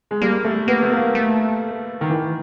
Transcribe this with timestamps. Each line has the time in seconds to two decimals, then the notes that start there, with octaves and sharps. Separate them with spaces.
0.11 G#3
0.21 G3 A#3
0.44 A3
0.68 A#3 B3
0.83 A3
0.91 A#3
1.15 A3
2.01 D#3
2.10 E3